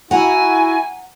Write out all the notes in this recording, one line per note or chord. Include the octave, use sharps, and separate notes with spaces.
E4 F#4 F#5 G#5 A#5